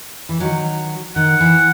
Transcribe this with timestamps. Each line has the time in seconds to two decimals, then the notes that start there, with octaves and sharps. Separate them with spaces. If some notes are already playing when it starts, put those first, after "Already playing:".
0.29 E3
0.40 D#3 F#3
1.16 D#3 F#5
1.40 E3